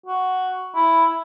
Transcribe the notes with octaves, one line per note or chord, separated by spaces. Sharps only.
F#4
E4